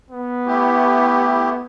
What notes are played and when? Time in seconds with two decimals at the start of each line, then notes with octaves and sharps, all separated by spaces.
0.10 B3
0.46 A3 E4 G4